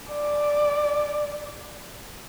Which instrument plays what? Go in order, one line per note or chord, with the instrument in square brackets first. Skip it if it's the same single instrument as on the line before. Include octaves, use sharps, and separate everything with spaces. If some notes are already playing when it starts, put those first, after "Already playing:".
[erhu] D5